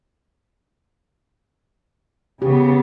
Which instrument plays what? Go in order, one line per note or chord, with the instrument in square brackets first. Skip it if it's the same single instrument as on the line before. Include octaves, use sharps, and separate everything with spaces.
[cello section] C#3 B3 [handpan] G4